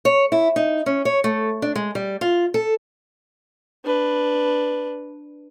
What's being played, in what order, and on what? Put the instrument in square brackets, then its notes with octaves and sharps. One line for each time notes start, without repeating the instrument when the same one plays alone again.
[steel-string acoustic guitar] C#5
E4
D#4
C#4
C#5
A3
D4
G#3
G3
F4
A4
[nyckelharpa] D4 B4